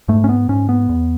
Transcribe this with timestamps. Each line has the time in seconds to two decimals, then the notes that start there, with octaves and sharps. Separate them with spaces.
0.08 G#2 A3
0.24 C#4
0.29 B3
0.49 G#2 C#4
0.69 B3
0.89 E2